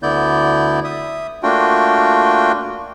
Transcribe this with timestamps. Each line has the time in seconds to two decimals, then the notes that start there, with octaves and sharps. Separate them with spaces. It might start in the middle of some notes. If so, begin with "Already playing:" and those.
0.03 D2 D3 B3 E4 D5 G6
0.84 E5 D#6
1.43 A3 A#3 D4 F4 F#4 G5